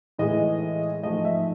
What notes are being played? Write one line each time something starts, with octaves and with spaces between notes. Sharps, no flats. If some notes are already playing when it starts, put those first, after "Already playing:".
A2 E3 G#3 D#5
G#2 F3 A3 D#5
E5